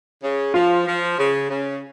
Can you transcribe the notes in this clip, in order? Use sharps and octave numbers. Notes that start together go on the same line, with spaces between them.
C#3
F3 F4
F3
C#3
C#3